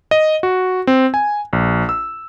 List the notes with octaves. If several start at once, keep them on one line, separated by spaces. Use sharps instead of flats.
D#5
F#4
C4
G#5
A#1
E6